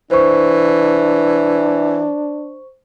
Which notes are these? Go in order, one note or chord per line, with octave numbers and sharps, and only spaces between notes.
E3 D4 C5 C#6